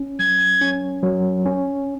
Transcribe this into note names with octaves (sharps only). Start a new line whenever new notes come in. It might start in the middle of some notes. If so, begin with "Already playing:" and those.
Already playing: C#4
F#3 G#6
C#4
F#3
C#4